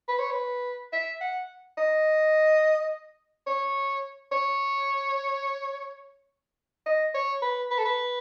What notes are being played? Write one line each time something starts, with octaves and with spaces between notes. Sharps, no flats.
B4
C#5
B4
E5
F#5
D#5
C#5
C#5
D#5
C#5
B4
B4
A4
B4